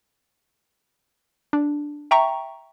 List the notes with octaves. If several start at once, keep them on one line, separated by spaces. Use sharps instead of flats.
D4
E5 G5 A#5 C#6